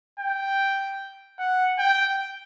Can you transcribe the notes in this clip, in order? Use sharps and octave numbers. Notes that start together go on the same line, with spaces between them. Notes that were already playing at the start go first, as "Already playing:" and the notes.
G5
F#5
G5